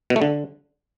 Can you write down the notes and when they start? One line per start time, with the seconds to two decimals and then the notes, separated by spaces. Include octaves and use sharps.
0.10 B2
0.16 A3
0.22 D3